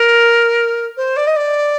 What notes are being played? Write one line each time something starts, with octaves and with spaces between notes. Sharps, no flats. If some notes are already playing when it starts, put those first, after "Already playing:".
Already playing: A#4
C5
D5
D#5
D5